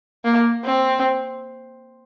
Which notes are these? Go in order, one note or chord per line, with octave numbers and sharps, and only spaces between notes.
A#3
C4